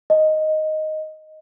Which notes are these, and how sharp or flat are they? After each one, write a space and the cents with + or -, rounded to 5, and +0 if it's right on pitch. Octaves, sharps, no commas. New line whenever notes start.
D#5 +0